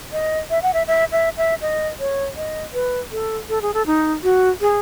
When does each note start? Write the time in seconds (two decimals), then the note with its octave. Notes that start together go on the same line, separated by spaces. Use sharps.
0.13 D#5
0.50 E5
0.62 F#5
0.74 E5
0.87 E5
1.12 E5
1.37 E5
1.61 D#5
1.99 C#5
2.36 D#5
2.74 B4
3.12 A4
3.49 A4
3.62 G#4
3.74 A4
3.86 D#4
4.23 F#4
4.61 G#4